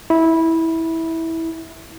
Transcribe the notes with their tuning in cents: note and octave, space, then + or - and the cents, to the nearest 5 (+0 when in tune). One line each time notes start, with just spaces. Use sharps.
E4 -15